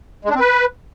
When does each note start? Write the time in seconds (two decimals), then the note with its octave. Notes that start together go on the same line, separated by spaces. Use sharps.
0.25 G#3
0.30 D4
0.35 C4
0.40 B4